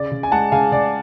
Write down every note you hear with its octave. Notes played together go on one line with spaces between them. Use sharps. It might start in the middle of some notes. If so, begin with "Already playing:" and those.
Already playing: C#3 D5
C#3
G#5
G#3 F#5 A5
C#3 F5 G#5
C#3 D5